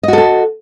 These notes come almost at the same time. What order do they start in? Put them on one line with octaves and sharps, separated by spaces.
D#5 F#4 A4 A5